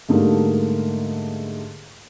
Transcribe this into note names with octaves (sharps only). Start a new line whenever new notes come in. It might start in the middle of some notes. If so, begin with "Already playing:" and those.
G#2 D3 G3 A3 A#3 D#4